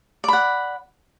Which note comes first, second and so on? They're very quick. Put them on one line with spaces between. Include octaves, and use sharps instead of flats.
D5 B5 F#5